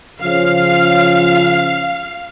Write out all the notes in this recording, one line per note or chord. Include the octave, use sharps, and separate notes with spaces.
C#3 F3 F5